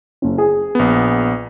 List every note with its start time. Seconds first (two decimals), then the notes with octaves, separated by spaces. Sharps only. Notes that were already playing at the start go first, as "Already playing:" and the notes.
0.22 F#1 C#4
0.38 G#4
0.75 A#1 B3